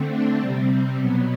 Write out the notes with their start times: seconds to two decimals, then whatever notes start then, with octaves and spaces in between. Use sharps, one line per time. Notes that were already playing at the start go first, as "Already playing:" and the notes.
Already playing: D3 A3 C4
0.10 D4
0.40 C3 G3 C4
0.99 B2 F#3 B3